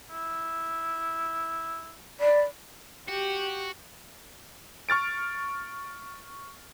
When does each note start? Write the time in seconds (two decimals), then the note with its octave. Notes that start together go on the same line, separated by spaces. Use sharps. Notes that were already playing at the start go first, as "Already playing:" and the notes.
0.11 E4
2.20 D5 B5
3.08 F#4 G4
4.89 C#6 F6 A6 D7